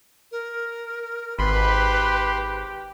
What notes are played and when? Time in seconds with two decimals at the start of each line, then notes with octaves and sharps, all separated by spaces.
0.31 A#4
1.39 G#1 G4 B4 B5 C6